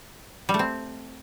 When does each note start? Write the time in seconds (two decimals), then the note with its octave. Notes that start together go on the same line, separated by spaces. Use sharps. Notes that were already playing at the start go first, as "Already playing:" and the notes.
0.49 G3
0.54 A3
0.59 C4